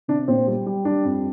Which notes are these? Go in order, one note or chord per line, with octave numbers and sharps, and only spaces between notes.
C3 D4
A#2 C4
G3
G3
G3 D4
F2